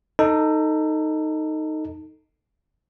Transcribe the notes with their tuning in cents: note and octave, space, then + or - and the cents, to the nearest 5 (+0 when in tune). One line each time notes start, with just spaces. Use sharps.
D#4 +0 A4 +20